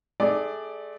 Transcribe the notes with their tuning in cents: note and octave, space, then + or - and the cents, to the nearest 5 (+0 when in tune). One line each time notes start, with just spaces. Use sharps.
A3 -30 G#4 -30 D5 +0